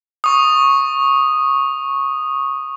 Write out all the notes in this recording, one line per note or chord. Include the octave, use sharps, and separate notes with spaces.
C#6 D#6